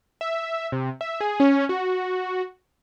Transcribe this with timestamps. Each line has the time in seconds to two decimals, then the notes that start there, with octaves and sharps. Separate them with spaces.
0.21 E5
0.72 C3
1.01 E5
1.21 G#4
1.40 C#4
1.69 F#4